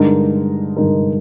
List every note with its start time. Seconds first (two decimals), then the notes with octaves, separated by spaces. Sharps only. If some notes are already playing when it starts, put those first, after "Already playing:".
Already playing: G2 D3 G#3 D#4 A#4
0.77 G2 D3 G#3 D#4 A#4